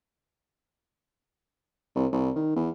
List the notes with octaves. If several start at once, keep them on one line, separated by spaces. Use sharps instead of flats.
C2
C2
D#3
E2